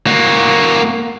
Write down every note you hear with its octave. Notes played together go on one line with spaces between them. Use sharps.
A#3 F#4